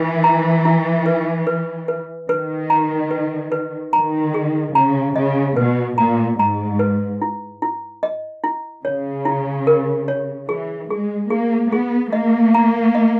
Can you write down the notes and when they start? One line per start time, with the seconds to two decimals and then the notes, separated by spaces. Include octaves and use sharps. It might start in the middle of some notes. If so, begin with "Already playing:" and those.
Already playing: E3 B4
0.24 A#5
0.65 E4
1.06 B4
1.47 B4
1.88 B4
2.29 D#3 B4
2.70 A#5
3.11 B4
3.52 B4
3.93 D#3 A#5
4.34 G#4
4.75 C#3 A#5
5.16 C#3 D#5
5.56 B2 B4
5.98 A#2 A#5
6.39 G#2 A#5
6.79 B4
7.22 E4
7.62 E4
8.03 D#5
8.44 E4
8.84 C#3 C#5
9.25 E4
9.67 A#4
10.08 C#5
10.49 E3 G#4
10.90 G#3 G#4
11.30 A#3 G#4
11.72 B3 G#4
12.12 A#3 D#5
12.54 A#5
12.95 D#5